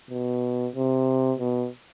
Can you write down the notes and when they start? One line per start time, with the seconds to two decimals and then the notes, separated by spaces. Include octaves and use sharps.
0.11 B2
0.76 C3
1.39 B2